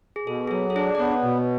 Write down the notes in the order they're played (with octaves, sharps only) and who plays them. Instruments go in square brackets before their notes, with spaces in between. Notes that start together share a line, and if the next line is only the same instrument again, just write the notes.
[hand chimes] G#4
[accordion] B2 [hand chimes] A4
[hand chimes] G#4
[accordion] F#3 [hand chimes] A4
[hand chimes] A4
[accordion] D4 [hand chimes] G#4
[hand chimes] D5
[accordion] B3 [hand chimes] C#5
[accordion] B2